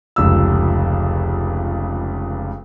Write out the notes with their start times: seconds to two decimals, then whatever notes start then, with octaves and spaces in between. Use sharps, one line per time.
0.16 F1 C#2 E6